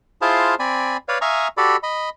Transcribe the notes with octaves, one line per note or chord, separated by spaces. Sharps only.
E4 F4 G#4 C5 F5 A5
C4 D5 G#5 B5
B4 C#5 D5 F5
E5 F5 G#5 A#5 C#6 D#6
F#4 G4 A4 D5 B5
D#5 B5